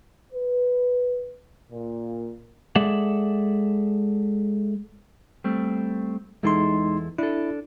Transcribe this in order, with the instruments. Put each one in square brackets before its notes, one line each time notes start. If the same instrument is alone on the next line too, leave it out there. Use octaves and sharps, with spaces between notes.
[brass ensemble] B4
A#2
[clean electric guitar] G#3 G#4 A4 D5 E5 F#5
G3 A3 C4
[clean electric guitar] E2 E4 A4 [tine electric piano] G#3 D#4 C6
[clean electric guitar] D4 A4 [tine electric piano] E4